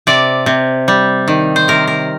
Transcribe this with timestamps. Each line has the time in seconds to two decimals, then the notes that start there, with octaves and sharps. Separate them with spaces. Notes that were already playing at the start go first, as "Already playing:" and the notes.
0.07 C3 D5
0.46 C3
0.88 G3
1.28 D#3
1.56 C5
1.68 C3 A#4
1.87 A#4